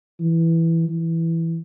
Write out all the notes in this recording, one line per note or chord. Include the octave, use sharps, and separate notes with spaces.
E3
E3